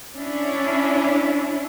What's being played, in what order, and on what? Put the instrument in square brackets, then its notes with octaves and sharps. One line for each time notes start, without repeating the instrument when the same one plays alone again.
[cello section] C#4 D4 E4